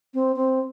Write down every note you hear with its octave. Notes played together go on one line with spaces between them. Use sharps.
C4
C4